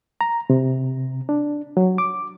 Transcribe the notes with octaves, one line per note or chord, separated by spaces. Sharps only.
A#5
C3
D4
F#3
D6